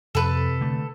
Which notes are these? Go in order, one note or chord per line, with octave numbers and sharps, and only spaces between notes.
F2 C3 A4 B4
D3 A3